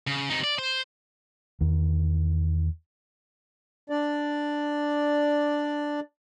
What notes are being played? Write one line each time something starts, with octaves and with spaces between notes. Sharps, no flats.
C#3
C3 D#4
D5
C5
E2 D#3
D4 D5